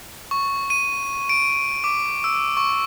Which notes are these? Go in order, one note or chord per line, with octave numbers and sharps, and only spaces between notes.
C#6
D#7
D7
D6
E6
C#6